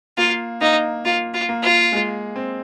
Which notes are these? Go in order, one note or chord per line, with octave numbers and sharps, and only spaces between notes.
A#3 F4
A#3 D#4
A#3 F4
F4
A#3
F4
G#3
C4